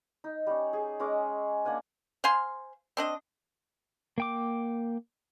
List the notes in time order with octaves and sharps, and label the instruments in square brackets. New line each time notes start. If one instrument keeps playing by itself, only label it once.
[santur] D#4
G3 C#4
G#4
G#3 C#4 D#5 D6
A#3 D4 F#5 G#5
[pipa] C5 F5 G#5 C6
C4 D4 D#5
[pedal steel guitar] A#3 G5 D6